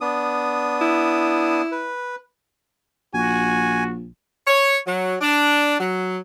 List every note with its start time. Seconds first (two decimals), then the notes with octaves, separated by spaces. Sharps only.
0.01 B3 D4 D#6
0.81 E4
1.72 B4
3.14 A#1 F#4 G#5
4.46 C#5
4.86 F#3
5.21 D4
5.80 F#3